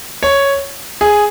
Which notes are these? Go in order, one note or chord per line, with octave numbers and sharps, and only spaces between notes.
C#5
G#4